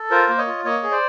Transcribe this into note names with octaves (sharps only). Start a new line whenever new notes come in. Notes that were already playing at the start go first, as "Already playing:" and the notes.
Already playing: A4
F4 A#4 C5
A#3
C#5 D#5
F4
A#3 C#5 D#5
G#4
C5 D5